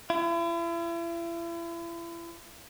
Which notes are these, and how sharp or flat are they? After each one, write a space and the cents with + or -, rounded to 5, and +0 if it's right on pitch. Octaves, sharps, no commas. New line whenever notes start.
E4 +40